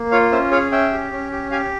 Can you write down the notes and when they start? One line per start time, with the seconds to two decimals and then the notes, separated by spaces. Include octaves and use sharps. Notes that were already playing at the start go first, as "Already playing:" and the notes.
Already playing: A#3
0.11 F4 C#5 F5
0.32 C#4 C5 E5
0.51 G#4 C#5 F5
0.72 C#4 E5 G5
0.92 G4
1.12 C#4
1.32 G4
1.51 G4 F5 G#5